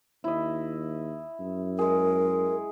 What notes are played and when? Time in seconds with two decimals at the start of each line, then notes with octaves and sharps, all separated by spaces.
0.24 D#2 E4 D#5
1.40 F#2
1.79 G#3 G#4 A#4